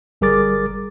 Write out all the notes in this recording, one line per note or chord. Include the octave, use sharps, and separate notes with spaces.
G1 G3 G#4 A#4 D6 A6